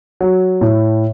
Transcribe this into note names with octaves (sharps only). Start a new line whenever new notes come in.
F#3
A2